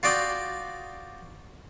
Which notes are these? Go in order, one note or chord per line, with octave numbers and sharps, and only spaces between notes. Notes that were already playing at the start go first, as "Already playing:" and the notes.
F4 F#4 D5 G5 D#6